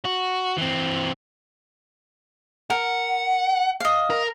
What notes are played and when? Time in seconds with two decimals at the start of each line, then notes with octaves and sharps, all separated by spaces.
0.05 F#4
0.58 E3 C4
2.70 A#4 F#5
3.80 D#5 F5
4.10 A#4